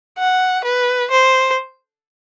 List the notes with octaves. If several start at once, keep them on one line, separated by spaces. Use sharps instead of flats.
F#5
B4
C5